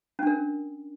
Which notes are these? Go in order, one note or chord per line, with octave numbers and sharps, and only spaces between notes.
C#4 D4 A#4